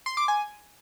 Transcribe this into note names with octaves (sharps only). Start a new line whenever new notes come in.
C6
D6
G#5